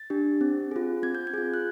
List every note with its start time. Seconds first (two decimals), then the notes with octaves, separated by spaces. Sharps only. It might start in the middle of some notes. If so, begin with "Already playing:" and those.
Already playing: A6
0.10 D4 G4
0.41 C4
0.71 F4 G#4
1.03 C4 G#6
1.15 G6
1.27 G#6
1.34 F4 G#4
1.54 F#6